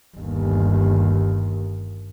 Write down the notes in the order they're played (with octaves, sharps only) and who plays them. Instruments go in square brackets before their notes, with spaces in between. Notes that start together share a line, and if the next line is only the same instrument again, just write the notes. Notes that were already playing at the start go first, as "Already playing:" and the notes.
[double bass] G1 D#2